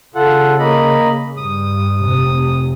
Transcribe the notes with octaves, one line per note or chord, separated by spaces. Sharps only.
C#3 F4 A4 F#5
A#3 D#5 B5
G2 D#6
F1 C3